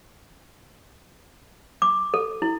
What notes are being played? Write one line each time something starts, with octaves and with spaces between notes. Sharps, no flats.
D6
A4
E4